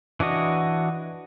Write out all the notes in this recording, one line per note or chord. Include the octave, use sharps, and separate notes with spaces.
E3 D4 F#4 D#5